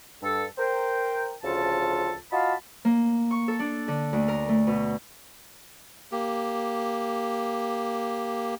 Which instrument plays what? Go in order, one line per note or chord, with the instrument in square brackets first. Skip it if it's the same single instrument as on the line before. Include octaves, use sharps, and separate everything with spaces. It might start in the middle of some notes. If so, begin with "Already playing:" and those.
[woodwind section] G2 A4
A#4 C5 G5
D2 C#3 F3 F4 A4 A5
F4 F#4 D#5 F5 A5 B5
[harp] A#3
C#6
A4
D4
D3
D2
A#4
A3
B2
[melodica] A#3 G4